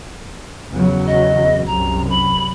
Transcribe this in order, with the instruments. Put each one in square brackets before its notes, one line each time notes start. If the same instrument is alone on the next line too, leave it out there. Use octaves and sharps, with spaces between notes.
[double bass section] E2 C#3 F#3
[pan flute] D#5
[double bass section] C2 F#2 [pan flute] A#5
[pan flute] B5